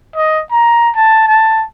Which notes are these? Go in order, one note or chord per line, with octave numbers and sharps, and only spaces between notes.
D#5
A#5
A5
A5